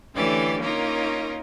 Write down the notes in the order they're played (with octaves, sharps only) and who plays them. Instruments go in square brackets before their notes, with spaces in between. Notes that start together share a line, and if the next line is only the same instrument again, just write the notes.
[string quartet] D3 E3 A3 C#4 G4 D5
A#3 C#4 D#4 F4 A#4